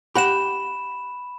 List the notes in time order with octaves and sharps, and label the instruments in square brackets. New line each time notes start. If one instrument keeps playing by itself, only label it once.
[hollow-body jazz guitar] G4 F#5 [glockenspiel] B5 E7